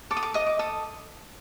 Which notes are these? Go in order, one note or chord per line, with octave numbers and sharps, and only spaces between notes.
A4 D6
D#6
D6
D#5 D#6
D6
A4 D#6